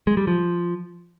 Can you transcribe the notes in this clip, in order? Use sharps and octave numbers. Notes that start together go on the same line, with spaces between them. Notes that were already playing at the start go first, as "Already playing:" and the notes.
G#3
G3
F3